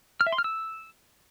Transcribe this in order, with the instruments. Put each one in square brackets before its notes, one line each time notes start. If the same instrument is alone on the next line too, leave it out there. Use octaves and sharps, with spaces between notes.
[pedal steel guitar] F6
E5
C6
F6
E6